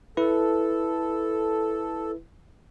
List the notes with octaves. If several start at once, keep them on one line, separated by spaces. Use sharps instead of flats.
E4 A4 B4